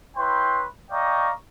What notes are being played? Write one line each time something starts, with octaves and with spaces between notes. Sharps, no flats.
E4 B4 C#5 G5 C6
D5 D#5 F5 G5 A#5 C#6